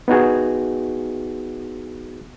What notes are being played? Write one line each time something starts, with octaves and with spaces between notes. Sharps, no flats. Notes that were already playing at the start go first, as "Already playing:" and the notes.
B3 D#4 F#4 G#4